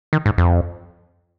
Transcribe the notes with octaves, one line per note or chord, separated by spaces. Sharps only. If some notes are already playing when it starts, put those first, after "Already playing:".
D#3
G#2
F2